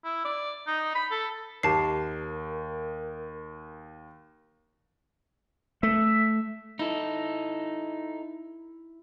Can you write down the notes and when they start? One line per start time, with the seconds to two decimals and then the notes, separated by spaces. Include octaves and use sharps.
0.04 E4
0.25 D5
0.67 D#4
0.95 B5
1.11 A4
1.63 D#2 G4 A#4 A5 C7
5.83 A3 E5
6.79 D#4 E4 A4